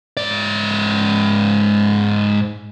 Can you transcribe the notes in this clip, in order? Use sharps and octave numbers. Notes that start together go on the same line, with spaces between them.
G#2 D5